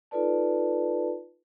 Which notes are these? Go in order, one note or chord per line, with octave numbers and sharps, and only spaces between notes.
D#4 F4 A4 B4 D5 A5